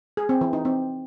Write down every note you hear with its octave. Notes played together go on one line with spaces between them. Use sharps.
G#4
C4
E3
D#4
C4